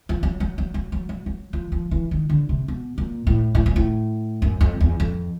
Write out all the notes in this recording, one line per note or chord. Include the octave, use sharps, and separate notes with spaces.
F3
F#3
F#3
F#3
F#3
F#3
F#3
F#3
F3
F3
E3
D#3
D3
C3
B2
A#2
A2
A2
A#2
A2
F#2
F2
E2
F2